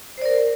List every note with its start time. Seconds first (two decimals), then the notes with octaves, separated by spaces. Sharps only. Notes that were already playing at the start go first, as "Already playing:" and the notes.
0.18 C5
0.22 D5
0.26 A#4